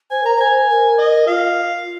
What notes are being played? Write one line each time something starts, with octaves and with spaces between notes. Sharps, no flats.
C5 G#5
A#4 A#5
C5 G#5
A#4
D#5
F4 F5